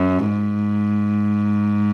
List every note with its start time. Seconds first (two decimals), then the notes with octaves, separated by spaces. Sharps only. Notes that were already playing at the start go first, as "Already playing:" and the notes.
Already playing: F#2
0.28 G#2